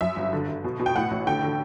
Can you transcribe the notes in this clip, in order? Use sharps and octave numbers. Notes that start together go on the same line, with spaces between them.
F#2 E5
G1
D3
D3
B2
B2
G5
A2 F#5
A1
D3 G5
D3